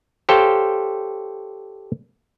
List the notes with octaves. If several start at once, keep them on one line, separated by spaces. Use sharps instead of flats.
G4 A4 C5 C#5 F5 G5